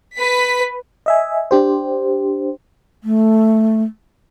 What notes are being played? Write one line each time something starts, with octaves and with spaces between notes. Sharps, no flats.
B4 B6
D#5 E5 G#5
D4 G4 C5
A3